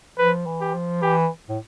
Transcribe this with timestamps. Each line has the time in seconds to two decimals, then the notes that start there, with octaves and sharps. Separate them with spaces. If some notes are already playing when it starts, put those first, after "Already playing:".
0.18 F3 B4
0.46 E3
0.61 G4
0.74 F3
1.02 E3 G4
1.49 A2